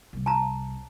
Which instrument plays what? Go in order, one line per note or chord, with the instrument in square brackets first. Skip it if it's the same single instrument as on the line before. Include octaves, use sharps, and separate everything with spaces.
[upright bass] C2
[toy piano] A5 A#5